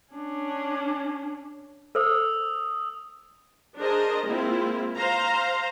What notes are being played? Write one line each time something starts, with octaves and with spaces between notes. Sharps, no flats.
C#4 D4
A4 C5 D#6 E6
D4 G#4 A#4 C5 D#5
G#3 A#3 C4 E4 F4
C5 F5 A#5